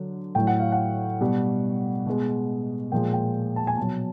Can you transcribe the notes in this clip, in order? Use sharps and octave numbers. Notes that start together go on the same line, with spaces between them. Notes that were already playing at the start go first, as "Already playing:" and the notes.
Already playing: D3 F#3
A2 F#3 G5
F#5
F5
F#5
B2 G3
B2 G#3
A#2 F3 G#3 G5
G5
A5
G#5
B2 F#3 A5